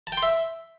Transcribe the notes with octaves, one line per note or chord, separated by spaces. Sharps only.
A5
G5
C6
E5